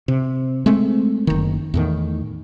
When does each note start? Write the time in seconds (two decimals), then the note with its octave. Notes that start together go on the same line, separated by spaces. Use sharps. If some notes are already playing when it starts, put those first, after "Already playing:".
0.08 C3
0.66 G#3 A3 C4
1.27 F#1 D#3
1.74 E2 A2 D#3